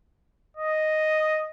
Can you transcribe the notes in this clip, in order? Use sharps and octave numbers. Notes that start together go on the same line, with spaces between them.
D#5